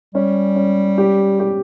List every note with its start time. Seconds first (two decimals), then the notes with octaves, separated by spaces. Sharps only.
0.15 G3 C#4
0.56 C#4
0.98 G4
1.40 G4